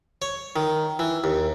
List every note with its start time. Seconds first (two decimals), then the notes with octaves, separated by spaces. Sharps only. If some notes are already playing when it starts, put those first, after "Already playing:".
0.22 C#5
0.56 D#3
0.99 E3
1.24 D#2